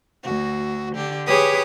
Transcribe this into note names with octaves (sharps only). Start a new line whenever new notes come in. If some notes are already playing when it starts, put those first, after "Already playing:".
D2 F#4
D3 G4
G4 G#4 B4 C#5 D6 D#6